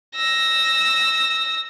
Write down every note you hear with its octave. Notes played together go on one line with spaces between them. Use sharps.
E6 A#6